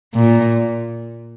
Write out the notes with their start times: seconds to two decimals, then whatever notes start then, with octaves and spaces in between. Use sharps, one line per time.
0.14 A#2